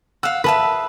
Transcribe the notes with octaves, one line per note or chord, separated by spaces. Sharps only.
F5 F#5 E6
B4 E5 A5 D#6